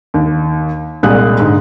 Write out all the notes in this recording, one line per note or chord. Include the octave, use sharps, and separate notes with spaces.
D#2
C2 A#2 G3 G#3 D#6 F#6
G#2 D3